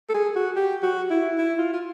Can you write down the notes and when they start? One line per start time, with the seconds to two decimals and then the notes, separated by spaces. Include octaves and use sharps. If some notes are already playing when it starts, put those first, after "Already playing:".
0.09 A4
0.14 G#4
0.36 F#4
0.56 G4
0.83 F#4
1.10 E4
1.38 E4
1.58 F4
1.73 F4